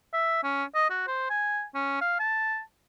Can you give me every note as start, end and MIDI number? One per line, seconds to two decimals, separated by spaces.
0.13 0.39 76
0.43 0.64 61
0.75 0.89 75
0.90 1.03 66
1.07 1.26 72
1.30 1.64 80
1.74 1.99 61
2.01 2.17 77
2.19 2.60 81